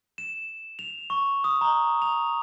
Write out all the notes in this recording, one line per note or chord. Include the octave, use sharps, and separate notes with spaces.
E7
F7
C#6
D#6
A#5
F7